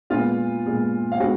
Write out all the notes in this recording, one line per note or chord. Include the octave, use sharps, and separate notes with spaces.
A#2 G#3 B3 F4 F5
A#2 G#3 B3
F5
G#3 B3 F#4 F#5